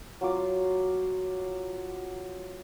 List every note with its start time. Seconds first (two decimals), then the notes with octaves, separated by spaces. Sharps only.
0.21 F#3 F4 D6